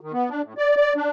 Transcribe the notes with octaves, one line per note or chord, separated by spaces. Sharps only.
D#3
B3
D4
A2
D5
D5
D4